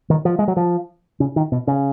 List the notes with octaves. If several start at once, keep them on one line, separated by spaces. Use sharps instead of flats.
D#3
F3
G#3
F#3
F3
C#3
D#3
B2
C#3